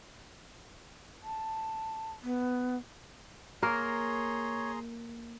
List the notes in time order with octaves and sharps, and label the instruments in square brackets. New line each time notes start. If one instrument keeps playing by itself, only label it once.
[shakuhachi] A5
B3
[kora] A#3 A#4 [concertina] G#4 A#5 C6 [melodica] C#5